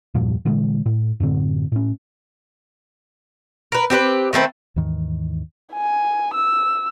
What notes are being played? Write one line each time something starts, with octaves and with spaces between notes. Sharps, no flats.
E2 G2 A#2 F3
A#2 D3 E3 G#3
A2
F#2 A2 D3 C4
A2 C#4
A#4 B4
C4 G4 A#4 B4
D#3 A3 C4 B4
D#2 G#2 D#3 E3
G#5
E6